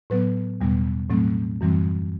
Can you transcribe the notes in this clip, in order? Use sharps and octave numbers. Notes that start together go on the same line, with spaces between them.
A2 F#3 B3 B4
E2 B2 G3 B3
A2 F#3 A3 C4
F#2 E3 G3 C4